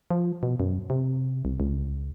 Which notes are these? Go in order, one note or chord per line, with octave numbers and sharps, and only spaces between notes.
F3
B2
F#2
C3
C2
C#2